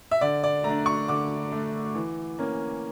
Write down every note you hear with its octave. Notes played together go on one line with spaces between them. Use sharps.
E5
D3 D5
D5
A3 A#5
D4
C#6
D3 D6
A3 D4
E3
A#3 C#4